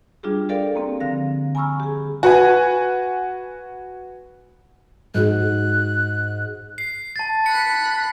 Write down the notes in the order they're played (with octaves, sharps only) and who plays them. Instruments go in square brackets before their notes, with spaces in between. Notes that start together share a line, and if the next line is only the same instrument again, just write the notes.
[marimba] G3 D4 F4 G4 G#4
G4 A4 A#4 D5 F5 G5
A#3 C4
D3 F3 F5 A#6
G#5 A#5 B5 C#6 E6 F6
G4 G#4
[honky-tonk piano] F#4 B4 G#5
[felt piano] G#2 F#4 G#4 [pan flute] F#6
[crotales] C7
[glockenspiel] A5 A6
[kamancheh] B5 F#6 [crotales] C#7